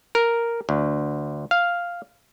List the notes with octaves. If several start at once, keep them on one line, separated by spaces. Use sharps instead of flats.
A#4
D2
F5